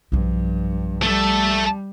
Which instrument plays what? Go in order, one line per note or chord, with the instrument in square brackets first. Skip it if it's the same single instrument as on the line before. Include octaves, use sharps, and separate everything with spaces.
[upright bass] B1 F3 [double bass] G2
[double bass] G3 [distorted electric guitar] A3 A4